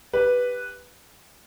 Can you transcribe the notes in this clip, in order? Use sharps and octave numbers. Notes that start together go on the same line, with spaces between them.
G4 B4